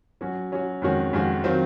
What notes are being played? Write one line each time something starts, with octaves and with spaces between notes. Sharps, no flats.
F#3 C#4 F#4
F#3 C#4 F#4
F2 D#3 G#3 C#4 F#4
F2 D#3 G#3 C#4 F#4
D#3 F#3 C4 F4